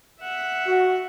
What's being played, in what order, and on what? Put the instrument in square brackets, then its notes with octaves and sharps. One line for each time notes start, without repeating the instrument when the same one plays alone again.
[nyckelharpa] E5 F#5
[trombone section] F#4